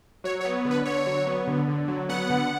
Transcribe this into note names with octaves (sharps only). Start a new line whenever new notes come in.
F#3 C#5
C#5
B3
D3
B4
D3 C#5
F#3
B3
D3
D3
F#3
B3 F#5
D3